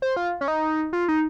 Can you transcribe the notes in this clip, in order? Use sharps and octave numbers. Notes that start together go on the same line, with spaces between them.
C5
F4
C#4
D#4
F4
D#4